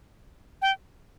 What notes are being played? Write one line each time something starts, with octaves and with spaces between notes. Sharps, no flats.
G5